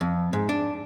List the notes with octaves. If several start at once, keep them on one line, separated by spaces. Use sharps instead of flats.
F2
G#2
D4